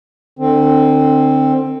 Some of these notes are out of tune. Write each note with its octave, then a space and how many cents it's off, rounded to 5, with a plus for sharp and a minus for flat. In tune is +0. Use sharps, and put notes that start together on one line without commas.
D3 +35 C4 +10